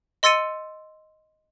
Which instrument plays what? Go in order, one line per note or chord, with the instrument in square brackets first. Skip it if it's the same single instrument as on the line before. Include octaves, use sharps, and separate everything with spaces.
[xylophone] D#5 C6 E6 A6 C#7 D#7